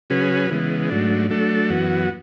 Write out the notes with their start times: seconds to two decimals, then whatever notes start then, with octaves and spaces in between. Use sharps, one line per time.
0.10 C#3 F#3 C#4 G#4 B4
0.51 C#3 E3 G#3 B3
0.89 G#2 F#3 A3 D4
1.30 F#3 A3 D4 A4
1.70 F#2 E3 B3 F#4